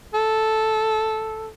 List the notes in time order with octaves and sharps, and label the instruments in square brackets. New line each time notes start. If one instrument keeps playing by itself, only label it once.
[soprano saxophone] A4